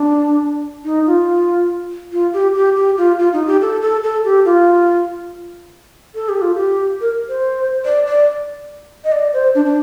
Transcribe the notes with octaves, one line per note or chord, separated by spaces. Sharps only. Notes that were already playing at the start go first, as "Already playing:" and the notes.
Already playing: D4
D#4
F4
F4
G4
G4
G4
F4
F4
D#4
G4
A4
A4
A4
G4
F4
A4
G4
F4
G4
A#4
C5
D5
D5
D#5
D5
C5
D4
D4